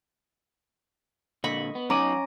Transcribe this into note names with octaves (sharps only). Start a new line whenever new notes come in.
A#2 D3 D#5 B5 C#6
B3
F#3 C#4 D#4 F#5 A#5 D6 D#7